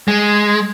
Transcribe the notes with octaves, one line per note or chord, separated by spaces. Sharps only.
G#3